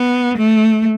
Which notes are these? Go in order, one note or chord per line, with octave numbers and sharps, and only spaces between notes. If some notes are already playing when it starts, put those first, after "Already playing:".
Already playing: B3
A3